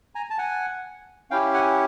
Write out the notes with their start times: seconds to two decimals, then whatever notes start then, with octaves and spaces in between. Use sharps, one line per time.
0.15 G#5 A#5
0.30 A5
0.38 F#5 G#5
1.30 C#4 E4 G4 F5 G5
1.54 F#5 G#5